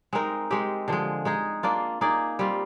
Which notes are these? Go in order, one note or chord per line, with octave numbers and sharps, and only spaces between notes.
G#3 C4 D#4 A#4
G#3 C4 G4
D3 F3 G#3
G#3 D#4 G#4
A#3 D4 F4
A#3 D#4 G#4 D5
G3 C4 F4